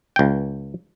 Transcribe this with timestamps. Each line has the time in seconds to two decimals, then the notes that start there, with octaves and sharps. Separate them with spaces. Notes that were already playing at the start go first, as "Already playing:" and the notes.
0.16 C#2 G5